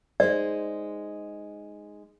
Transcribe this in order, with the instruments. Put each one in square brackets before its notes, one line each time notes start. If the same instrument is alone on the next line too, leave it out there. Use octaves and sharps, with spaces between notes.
[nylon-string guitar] G#3 D#4 C5 [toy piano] D5